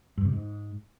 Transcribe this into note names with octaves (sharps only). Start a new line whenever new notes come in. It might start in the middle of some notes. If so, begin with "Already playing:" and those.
G2
C3
G#2